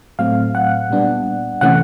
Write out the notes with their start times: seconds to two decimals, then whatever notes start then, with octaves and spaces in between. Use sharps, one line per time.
0.19 A2 F#3 A3 C4 F5
0.55 F#5
0.90 A#2 G3 B3 D4
1.61 C3 E3 A3 C#4 F#5